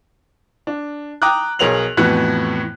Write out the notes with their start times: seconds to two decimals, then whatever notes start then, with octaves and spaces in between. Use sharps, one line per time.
0.67 D4
1.22 G5 A#5 D6 D#6 F#6
1.59 B1 G#4 A#4 C#5 F7 F#7
1.97 F2 A2 E3 B3 F#4 F#6